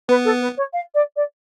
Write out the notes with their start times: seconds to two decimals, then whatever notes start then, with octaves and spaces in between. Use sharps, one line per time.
0.09 B3 B4
0.25 A4
0.41 B4
0.57 C#5
0.73 F5
0.94 D5
1.16 D5